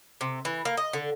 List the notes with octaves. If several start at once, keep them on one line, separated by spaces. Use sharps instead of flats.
C3
E3
A#3
D#5
D3